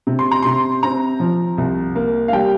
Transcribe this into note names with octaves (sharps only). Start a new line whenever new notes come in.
C3
C6
A#5
C3 C6
C4 A#5
F3
C2
A#3
F5
G3 G5